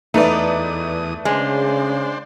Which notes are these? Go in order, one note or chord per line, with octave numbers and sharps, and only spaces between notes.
E2 A3 D#4 B4 D5 D#6
C#3 G#3 D4 C5